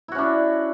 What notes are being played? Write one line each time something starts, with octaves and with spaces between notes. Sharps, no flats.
C#4 D4 E4 F#4